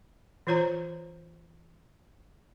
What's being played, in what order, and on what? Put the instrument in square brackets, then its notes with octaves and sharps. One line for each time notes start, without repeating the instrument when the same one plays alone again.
[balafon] E3 F4 C5 C#5 A#5